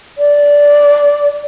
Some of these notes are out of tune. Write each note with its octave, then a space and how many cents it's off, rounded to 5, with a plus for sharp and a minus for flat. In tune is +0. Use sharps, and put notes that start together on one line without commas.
D5 -15